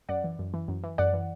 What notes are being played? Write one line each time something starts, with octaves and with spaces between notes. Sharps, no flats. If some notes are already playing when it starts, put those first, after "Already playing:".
F#2 D5 F#5
E3
F#2
E3
F#2
E3
F#2 D5 F#5
E3